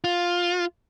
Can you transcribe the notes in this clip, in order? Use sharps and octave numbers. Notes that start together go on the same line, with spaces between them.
F4